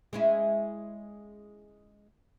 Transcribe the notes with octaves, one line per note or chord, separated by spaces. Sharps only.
G#3 C#4 E4